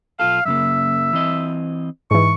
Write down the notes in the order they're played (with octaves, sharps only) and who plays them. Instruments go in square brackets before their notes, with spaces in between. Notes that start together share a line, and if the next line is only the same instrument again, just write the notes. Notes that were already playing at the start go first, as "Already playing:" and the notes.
[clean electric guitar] B1 F4 A4 [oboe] F5
[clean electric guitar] F#2 C#3 A#3 [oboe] E5
[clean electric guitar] E3 C4 D#5
[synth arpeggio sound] G#2 E3 [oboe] C#6